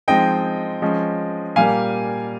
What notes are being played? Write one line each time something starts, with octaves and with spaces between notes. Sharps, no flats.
F3 G#3 C4 D#4 D#5 G5
F3 G#3 C#4
A#2 G3 A#3 F5 G#5